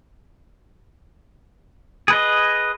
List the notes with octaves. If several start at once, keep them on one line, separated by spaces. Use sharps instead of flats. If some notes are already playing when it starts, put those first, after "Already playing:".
G#4 B4 D#5